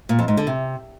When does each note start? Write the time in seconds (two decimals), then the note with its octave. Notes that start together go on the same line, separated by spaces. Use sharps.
0.09 A#2
0.19 F2
0.28 G#2
0.37 D3
0.47 C3